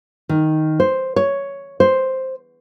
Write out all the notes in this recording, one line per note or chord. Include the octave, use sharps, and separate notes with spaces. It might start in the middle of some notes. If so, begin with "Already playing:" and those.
D#3
C5
C#5
C5